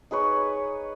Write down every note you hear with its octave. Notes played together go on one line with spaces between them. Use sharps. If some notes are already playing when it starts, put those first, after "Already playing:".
D#4 G#4 B4 C#5